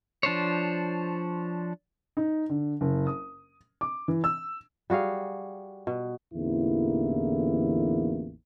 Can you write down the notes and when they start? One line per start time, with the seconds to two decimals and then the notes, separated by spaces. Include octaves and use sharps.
0.23 F3 D4 C5 C#5
2.17 D#4
2.49 D3
2.81 F#1
3.07 D#6
3.81 D6
4.08 E3
4.24 E6
4.90 G3 F#4 G#4 F5
5.87 B2
6.34 A1 E2 D3 A#3 D#4 E4